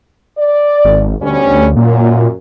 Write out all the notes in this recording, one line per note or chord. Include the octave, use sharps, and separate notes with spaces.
D5
G#1
D2 B2 G3 C#4
F#2 A#2